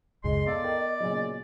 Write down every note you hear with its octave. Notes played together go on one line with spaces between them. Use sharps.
C#2 F#2 C#3 G#3 D#5 C6
B3 A4 D5 F5 E6
A#4 G5
A#2 C#3 F#3